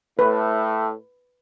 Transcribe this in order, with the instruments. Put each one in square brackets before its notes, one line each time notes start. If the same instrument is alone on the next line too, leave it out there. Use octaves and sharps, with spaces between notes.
[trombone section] A2 A3 [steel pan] B4